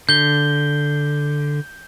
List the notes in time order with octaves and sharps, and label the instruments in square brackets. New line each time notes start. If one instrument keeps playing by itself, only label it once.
[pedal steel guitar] D3 [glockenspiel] G6 G7